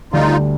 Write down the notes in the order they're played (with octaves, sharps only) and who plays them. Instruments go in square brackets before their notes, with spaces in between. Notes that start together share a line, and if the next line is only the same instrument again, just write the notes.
[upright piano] D2 D3 G3 [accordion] D#4 F4